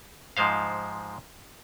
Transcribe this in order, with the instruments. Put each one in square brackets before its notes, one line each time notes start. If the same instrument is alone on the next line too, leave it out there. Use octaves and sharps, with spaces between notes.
[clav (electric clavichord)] G#2 F3 G#3 C5 F5